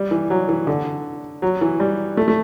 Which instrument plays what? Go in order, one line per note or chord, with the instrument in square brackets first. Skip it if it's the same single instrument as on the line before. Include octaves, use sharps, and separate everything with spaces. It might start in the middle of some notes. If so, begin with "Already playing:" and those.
Already playing: [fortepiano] G3
E3
F#3
E3
D3
F#3
E3
G3
A3
A3